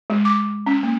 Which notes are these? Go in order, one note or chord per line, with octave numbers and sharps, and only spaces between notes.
G#3
D6
C#4
A#3